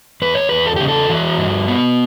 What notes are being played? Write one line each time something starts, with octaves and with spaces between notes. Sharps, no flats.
E2 B4
C#5
E2 B4
A4
C#3 G4
A4
E3 F#4
G2
B3